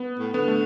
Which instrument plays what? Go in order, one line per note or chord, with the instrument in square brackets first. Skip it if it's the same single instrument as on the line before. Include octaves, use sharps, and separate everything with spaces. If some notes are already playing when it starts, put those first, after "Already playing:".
Already playing: [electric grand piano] B3
[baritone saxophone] A2
[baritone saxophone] D3 [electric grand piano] B3
[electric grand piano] A3